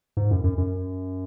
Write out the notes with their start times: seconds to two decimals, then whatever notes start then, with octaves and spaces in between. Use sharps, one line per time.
0.17 G#2
0.31 F#2
0.44 F#2
0.58 F#2